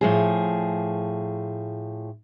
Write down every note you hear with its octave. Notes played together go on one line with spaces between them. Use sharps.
A2 F3 G#4